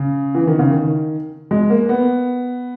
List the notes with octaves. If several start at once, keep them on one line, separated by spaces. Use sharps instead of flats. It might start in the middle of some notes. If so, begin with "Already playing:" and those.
Already playing: C#3
E3
D#3
C#3
D#3
G#3
A#3
B3